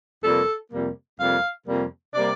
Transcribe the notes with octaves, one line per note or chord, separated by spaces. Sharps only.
F2 C3 G3 A#3 A4
F2 C3 G3 A#3
F2 C3 G3 A#3 F5
F2 C3 G3 A#3
C3 G3 A#3 D5